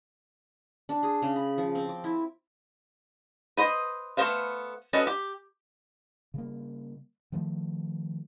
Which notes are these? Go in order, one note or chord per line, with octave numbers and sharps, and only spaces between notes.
D4
G#4
C#3
B5
F3
C4
D6
E4
B4 C5 D#5
A3 B3 A#4 C5 F5
C#4 F#4 A4 B4 D#5
G4
C#3 G3 A#3
D#3 F3 A3